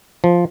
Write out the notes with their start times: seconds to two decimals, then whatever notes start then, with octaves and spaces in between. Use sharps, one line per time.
0.24 F3